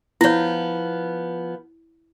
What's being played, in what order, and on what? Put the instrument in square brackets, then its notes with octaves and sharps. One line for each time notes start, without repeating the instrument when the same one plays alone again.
[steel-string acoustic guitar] F3 B3 [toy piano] E4 C#5